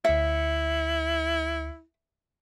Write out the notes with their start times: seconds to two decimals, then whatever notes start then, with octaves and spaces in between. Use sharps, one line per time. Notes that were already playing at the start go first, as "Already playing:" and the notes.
0.05 D2 E4 E5 C#7